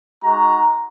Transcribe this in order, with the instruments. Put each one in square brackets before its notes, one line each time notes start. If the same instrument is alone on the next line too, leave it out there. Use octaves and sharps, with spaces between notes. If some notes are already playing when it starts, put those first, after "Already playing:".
[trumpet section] G#3 D#4 F#4 A#5